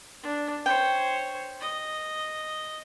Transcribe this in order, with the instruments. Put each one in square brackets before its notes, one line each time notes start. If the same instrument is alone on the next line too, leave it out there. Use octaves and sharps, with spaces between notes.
[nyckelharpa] D4
[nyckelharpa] C5 C#5 [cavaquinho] G5
[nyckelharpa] D#5